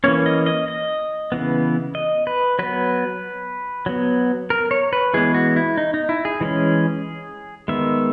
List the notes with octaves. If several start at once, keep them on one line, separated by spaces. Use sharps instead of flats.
E3 A#3 C#4 C#5
D#5
D#5
D#5
C#3 E3 B3
D#5
B4
F#3 B3 B4
F#3 B3
A#4
C#5
B4
E3 G#3 B3 G#4
F#4
E4
D#4
D#4
E4
G#4
E3 G#3 C#4
D#3 G#3 B3 E5